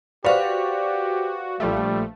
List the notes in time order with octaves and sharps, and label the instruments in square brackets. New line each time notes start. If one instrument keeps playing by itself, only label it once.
[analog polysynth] F#4 [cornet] G4 [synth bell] B4 F5 C#6 [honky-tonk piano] C5 D5
[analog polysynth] A#1 F3 A3 [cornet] G3